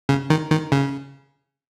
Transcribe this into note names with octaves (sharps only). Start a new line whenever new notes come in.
C#3
D#3
D#3
C#3